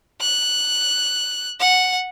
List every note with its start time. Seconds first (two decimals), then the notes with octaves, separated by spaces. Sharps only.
0.21 F#6
1.60 F#5